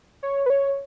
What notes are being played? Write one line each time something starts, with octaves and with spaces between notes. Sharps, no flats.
C#5
B4
C#5